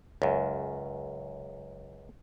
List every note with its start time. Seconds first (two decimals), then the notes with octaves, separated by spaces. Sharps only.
0.22 C#2 F#2